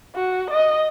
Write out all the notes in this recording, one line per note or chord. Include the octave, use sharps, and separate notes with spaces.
F#4
D#5